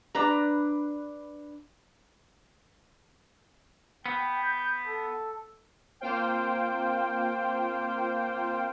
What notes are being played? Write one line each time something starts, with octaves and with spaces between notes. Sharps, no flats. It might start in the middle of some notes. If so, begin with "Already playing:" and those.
D4 B4 A#5
B3 G5
G6
A4
A#3 C4 F4 C5 F5 G5